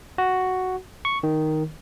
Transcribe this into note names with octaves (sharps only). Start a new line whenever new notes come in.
F#4
C#6
D#3